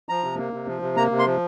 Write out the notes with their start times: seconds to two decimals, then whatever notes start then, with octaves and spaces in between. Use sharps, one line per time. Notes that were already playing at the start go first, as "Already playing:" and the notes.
0.09 F3 A#5
0.24 C3
0.39 A#3
0.53 C3
0.68 F3
0.82 C3
0.97 A#3 A#5
1.11 C3
1.19 C6
1.27 F3